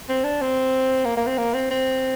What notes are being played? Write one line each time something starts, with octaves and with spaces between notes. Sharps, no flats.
C4
D4
C4
A#3
A#3
C4
A#3
C4
C4